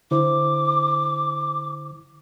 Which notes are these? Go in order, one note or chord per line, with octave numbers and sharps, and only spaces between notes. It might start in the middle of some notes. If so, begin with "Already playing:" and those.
D3 E4 C5 D6